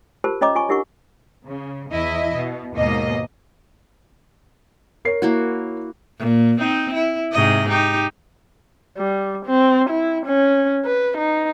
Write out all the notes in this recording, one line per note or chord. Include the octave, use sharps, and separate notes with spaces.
F4 G4 A#4 C5 A5
C#4 C#5 D#5 A#5 D6
F4 G#5 C#6
D4 E4 G4 A#4 F#5 C#6
C#3
E2 E4 D#5
B2
D#2 G#2 B2 A#3 D#5
A#4 C#5 C7
A#3 E4 F#4
A#2
C4 D#4
E4
G#2 C3 D#5
D#4 G4
G3
C4
E4
C#4
B4
D#4